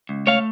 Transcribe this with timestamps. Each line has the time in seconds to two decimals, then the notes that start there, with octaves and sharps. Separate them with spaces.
0.09 C#2
0.27 A3 C#5 F5